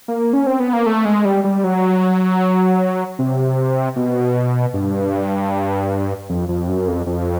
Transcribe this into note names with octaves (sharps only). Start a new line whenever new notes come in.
A#3
C#4
C4
B3
A#3
A3
G#3
G3
G3
F#3
C3
B2
G2
F2
F2
F#2
F2
F2